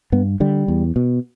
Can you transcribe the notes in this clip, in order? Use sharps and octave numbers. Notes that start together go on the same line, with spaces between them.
G2 B3
D3 G3
E2
B2